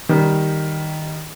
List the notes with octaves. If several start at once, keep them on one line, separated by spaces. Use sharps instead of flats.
D#3 G3